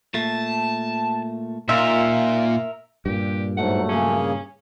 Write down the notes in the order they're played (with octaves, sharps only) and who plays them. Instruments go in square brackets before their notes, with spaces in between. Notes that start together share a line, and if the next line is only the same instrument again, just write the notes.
[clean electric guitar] A#2 A3 [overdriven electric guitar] A5
[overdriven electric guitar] A#2 [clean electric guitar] D#4 F4 [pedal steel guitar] A#4 E5
[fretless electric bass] G2 A#2 [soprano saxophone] G4
[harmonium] G#2 [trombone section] F#3 A3 [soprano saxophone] F#5
[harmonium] C#3 A#3 G#4 [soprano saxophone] C#4